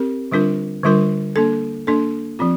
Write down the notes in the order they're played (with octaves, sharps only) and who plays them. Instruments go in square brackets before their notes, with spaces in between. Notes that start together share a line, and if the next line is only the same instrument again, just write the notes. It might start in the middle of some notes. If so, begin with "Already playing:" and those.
Already playing: [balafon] C4 G4 A#4
D3 G3 D4 F4 A#4
D3 G3 D4 F4 A#4
A#3 D4 A4
A#3 D4 A4
F3 C4 F4